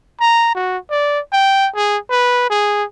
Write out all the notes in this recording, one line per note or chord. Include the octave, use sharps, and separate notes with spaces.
A#5
F#4
D5
G5
G#4
B4
G#4